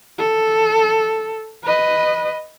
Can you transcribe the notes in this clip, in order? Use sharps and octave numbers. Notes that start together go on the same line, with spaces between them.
A4
B4 D#5